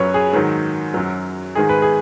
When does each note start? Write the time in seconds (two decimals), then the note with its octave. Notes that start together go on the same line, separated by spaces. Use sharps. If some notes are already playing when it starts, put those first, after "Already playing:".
Already playing: F#2 F#3 B4 C#5
0.14 G#4
0.33 G#2 D#3 F#3
0.94 F#2 F#3
1.55 G#2 D#3 G#3 G#4
1.69 B4
1.82 G#4